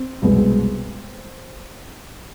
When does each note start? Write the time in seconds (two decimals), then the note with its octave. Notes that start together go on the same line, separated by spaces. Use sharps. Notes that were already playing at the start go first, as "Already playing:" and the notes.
Already playing: C4
0.22 C2 B2 G#3